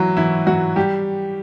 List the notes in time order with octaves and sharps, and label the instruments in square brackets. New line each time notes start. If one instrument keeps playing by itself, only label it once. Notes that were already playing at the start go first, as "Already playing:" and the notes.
Already playing: [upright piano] E3 F#3 E4 F#4
E3 E4
F#3 F#4
G3 G4